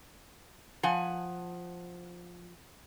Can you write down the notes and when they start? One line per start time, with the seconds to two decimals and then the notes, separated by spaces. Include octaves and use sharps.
0.83 F3 F#5 G#5